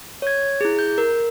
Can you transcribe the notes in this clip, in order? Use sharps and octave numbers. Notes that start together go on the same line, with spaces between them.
C#5 G#6
E4 G#4
G6
A#4